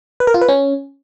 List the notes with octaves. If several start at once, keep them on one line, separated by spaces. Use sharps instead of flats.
B4
A#4
F4
B4
C#4